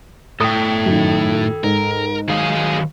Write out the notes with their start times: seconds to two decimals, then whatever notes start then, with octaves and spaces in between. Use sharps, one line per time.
0.41 A2 A4 G5 D#6
0.86 F#2 D#3
1.64 G#2 A#4
2.29 D#3 F#3 G#4 D#5 F5